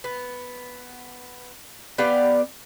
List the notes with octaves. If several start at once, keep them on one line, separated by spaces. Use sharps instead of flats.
B3
B3 G4 D5 F5